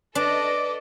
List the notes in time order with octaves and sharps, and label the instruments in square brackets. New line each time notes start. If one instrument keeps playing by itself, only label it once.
[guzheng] D4 [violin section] A4 D5 D#5 [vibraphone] B4 [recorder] D6